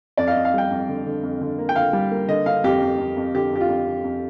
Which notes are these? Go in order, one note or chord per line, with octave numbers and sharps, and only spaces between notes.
F2 D5
F5
D#5
F2
F5
G3 G5
F2
D3
D3
F2
D3
A#3
G5
D3 F5
G3
A#3
D3 D#5
D3 F5
F2 G4
F2
F2
F2
D3 G4
F2 G4
F4
F2
F2
F2